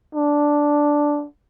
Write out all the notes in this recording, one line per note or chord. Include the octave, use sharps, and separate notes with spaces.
D4